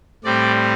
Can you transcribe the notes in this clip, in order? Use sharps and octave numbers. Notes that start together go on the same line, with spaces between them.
A2 G3 C4 D5